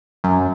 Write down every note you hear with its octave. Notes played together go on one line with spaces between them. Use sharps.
F#2